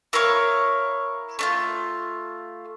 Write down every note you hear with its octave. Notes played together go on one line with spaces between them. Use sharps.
E4 A#4 C#5 F5
A3 D4 F4